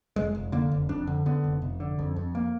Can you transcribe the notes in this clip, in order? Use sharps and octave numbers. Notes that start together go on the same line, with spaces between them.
F1 G#3
F1
D3 A#3
F1
F2 D4
D3
D3 B3
F1
F1
D3
F2
F2
A#3